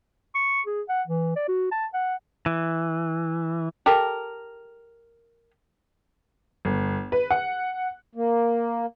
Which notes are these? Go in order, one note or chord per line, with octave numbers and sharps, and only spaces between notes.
C#6
G#4
F#5
E3
D5
F#4
A5
F#5
E3
G4 A4 A#4
G1
B4
F#5
A#3